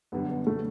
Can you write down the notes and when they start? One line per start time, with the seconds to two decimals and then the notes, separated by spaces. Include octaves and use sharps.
0.12 F#2 D3 G3 B3
0.29 B3
0.47 A3